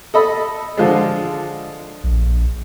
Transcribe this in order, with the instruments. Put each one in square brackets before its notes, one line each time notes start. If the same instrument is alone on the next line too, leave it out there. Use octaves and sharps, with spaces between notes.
[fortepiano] A4 D#5 B5
D3 F3 G#3
[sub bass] A#1